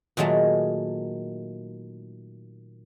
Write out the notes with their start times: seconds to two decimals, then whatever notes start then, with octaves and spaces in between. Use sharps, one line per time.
0.17 A#2 D#3 F#3 G#3 A3